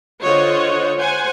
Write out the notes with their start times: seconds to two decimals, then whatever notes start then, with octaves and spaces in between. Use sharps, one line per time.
0.23 D3 F4 C5 C#5 D#5 F#5
0.97 C5 F#5 G#5